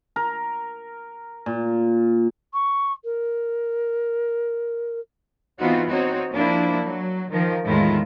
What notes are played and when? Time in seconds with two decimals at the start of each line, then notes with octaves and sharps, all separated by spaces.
0.16 A#4
1.46 A#2
2.53 C#6
3.04 A#4
5.59 E3 B3 C4 D#4 F4 F#4
5.88 C4 D#4 F#4 C#5
6.33 F3 A#3 D4 E4
6.84 F#3
7.30 D#3 F3 A#4
7.66 E2 A2 D#3 G#3 E4 F4